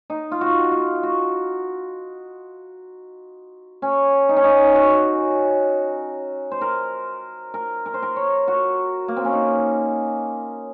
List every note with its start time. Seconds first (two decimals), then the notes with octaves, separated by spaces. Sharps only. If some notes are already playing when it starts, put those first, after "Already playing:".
0.10 D#4
0.31 F4
0.41 F#4
0.72 F4
1.03 F#4
3.82 C#4
4.29 D#4
4.36 C#4
4.44 D#4
4.75 F#4
6.51 C5
6.61 A#4
7.54 A#4
7.86 A#4
7.94 C5
8.02 A#4
8.16 C#5
8.48 F#4
9.08 A#3
9.17 C4
9.25 C#4
9.32 D#4